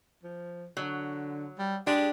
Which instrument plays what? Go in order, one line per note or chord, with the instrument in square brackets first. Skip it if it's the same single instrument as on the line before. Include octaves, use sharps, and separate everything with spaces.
[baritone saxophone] F3
[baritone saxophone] D3 [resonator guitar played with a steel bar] F#3
[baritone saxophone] G3
[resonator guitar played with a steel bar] G#3 G4 [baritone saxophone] D4